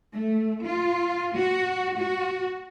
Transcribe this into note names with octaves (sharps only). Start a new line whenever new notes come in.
A3
F4
F#4
F#4